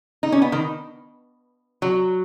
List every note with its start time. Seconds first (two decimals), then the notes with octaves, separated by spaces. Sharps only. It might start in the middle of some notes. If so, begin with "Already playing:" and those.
0.23 D#4
0.32 C#4
0.42 B3
0.52 D#3
1.82 F#3